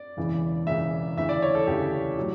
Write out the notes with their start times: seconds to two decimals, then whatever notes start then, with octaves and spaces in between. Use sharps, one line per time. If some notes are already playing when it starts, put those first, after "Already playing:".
Already playing: D5
0.17 E1 E2 C#3 E3
0.66 E1 E2 C#3 E3 E5
1.17 D2 C#3 E3 E5
1.29 D5
1.42 C#5
1.55 A4
1.67 D2 C#3 E3 G4
2.18 A2 F#3